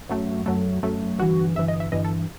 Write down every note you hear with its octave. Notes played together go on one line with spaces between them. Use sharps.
F#2 F#3 A3
F#2 F#3 A3
F#2 F#3 A3
G1 G2 E3 F#4
G1 G2 E3 E5
D#5
E5
G1 G2 E3 D#5
A4